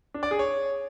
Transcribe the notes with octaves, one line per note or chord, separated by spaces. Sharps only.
D4
D5
G#4
C#5